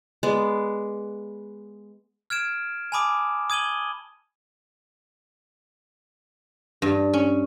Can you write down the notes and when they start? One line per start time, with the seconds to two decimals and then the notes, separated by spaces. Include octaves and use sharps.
0.23 G#3 B3 D5
2.30 F6 G#6 D7 E7
2.92 G#5 A5 B5 D6 D#6
3.50 D#6 G#6 D#7 F#7 G7
6.82 G2
7.13 C#4